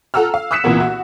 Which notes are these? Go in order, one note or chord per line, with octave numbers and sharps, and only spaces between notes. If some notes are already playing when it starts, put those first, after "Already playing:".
F4 A4 F#5 A#5 E6 F6
F5
D#6 E6 F#6 B6 C#7 E7
C2 A#2 E3 A#3 B3
F#4